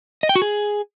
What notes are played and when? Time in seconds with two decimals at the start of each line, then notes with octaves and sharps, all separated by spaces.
0.23 D#5
0.29 G5
0.36 F#4
0.42 G#4